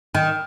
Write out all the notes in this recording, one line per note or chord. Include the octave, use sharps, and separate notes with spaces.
D#3